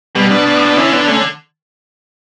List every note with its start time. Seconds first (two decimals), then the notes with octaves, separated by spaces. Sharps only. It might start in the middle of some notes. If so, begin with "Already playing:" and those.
0.15 B2 G3 B3
0.30 B2 B3 D4
0.46 B2
0.55 A2
0.64 B2
0.77 D3 C#4 E4
0.92 B3 D4
1.08 A3 C#4